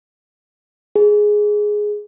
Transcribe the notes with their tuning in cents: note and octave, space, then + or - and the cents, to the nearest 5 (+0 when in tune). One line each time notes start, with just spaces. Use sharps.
G#4 +5